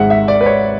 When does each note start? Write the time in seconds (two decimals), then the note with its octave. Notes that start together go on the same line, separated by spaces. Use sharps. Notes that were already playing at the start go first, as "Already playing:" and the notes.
Already playing: G#1 G#2 G#3 E5 F#5
0.10 E5
0.28 D5
0.41 B4
0.46 C#5